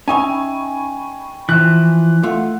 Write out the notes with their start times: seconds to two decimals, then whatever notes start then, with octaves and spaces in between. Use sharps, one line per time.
0.08 C#4 D#4 E5 G5 G#5 B5 C#6
1.49 E3 F3 F#6
2.23 A3 F4 F5 F#5